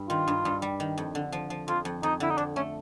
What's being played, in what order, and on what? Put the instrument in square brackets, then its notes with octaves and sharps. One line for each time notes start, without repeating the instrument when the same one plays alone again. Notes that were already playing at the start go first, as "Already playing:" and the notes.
Already playing: [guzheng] G2 G3
[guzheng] D#3 [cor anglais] F4
[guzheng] G2
G2
G3
D#3
F2
D3
F3
F3
[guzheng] F2 [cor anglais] F4
[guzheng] F2
[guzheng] F2 [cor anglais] D#4
[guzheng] D3 [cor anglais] E4
[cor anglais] D#4
[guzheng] F2 [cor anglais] D4
[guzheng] A3 [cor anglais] C#4